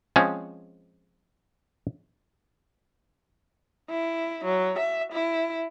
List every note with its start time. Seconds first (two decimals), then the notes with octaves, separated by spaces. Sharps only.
0.16 F3 G#3 C4 C#4 G#4
3.90 E4
4.45 F#3
4.79 E5
5.13 E4